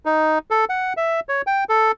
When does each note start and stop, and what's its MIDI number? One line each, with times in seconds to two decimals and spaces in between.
0.05 0.39 63
0.51 0.65 69
0.69 0.93 78
0.97 1.20 76
1.29 1.42 73
1.47 1.64 79
1.69 1.92 69